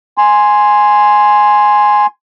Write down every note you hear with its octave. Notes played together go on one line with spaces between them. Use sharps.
G#5 C6